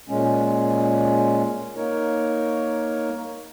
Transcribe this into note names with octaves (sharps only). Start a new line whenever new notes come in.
A#2 G#3 C#4
A#3 D#4 A#4 C#5